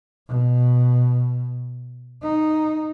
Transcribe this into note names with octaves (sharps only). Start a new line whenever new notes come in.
B2
D#4